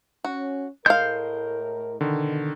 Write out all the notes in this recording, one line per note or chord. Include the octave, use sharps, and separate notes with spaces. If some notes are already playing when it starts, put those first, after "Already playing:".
C#4 F#4
A2 G#3 A#4 F5 G6
B2 D3 D#3